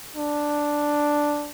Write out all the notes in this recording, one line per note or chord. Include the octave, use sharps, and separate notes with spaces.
D4